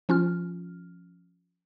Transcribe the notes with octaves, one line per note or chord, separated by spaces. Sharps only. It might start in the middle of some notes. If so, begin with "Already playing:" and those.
F3 C#4 F4 F6